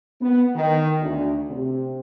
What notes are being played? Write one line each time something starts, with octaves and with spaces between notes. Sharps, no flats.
B3
D#3
D2
C3